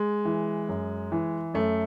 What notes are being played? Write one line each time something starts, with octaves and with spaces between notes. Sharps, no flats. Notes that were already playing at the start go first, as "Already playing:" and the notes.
Already playing: G#3
E3
F#2
E3
F#2 A3